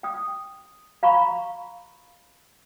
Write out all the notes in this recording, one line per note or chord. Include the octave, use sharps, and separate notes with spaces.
G5 D#6
F5 A#5 B5 C#6